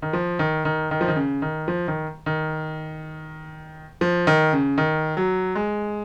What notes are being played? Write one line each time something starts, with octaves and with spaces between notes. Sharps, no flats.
D#3
F3
D#3
D#3
D#3
F3
D#3
C#3
D#3
F3
D#3
D#3
F3
D#3
C#3
D#3
F#3
G#3